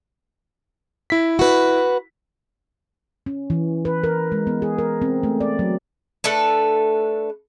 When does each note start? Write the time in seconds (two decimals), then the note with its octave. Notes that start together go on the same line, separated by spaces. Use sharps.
1.10 E4 B6
1.39 F#4 B4
3.26 C#4
3.50 E3
3.85 B4
4.04 A#4
4.32 G#3
4.47 B3
4.62 G#4
4.78 A#4
5.02 C4
5.23 A3
5.40 D5
5.59 F#3
6.24 A3 D4 A4 B4